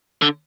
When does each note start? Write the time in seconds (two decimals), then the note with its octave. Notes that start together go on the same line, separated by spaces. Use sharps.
0.22 D3